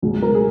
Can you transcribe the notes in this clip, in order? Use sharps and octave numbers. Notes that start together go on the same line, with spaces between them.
C#2 B2 F#3
A#4
G#4